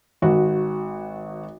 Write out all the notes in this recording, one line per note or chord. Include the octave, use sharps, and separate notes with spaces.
G#1 F#4